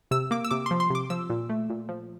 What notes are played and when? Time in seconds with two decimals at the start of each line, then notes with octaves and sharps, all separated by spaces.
0.11 C3 E6
0.31 A#3 D6
0.44 E6
0.51 C3 D6
0.66 F3 C6
0.80 C6
0.90 C3 D6
1.10 F3 E6
1.30 A#2
1.49 A3
1.70 A#2
1.89 F3